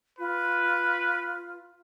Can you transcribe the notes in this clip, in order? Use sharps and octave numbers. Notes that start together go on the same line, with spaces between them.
F4 B4